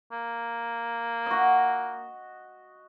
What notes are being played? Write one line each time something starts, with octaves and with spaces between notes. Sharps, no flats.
A#3
F#4 D#5